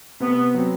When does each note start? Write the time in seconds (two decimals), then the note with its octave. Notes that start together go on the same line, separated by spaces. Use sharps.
0.20 C3 B3
0.55 F#3 C4